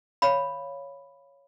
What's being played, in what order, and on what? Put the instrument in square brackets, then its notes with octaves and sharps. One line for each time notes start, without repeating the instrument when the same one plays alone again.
[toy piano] C#5 F5 B5